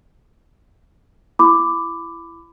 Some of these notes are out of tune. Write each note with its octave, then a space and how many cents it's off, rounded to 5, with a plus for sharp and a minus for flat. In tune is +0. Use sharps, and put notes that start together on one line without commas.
E4 +20 B5 +20 D6 +0